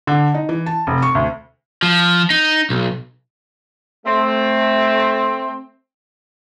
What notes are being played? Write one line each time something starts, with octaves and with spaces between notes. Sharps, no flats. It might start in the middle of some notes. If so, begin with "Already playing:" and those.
D3
D#4
E3
A5
F1
C#6
D2
F3
D#4
B1
A3 C4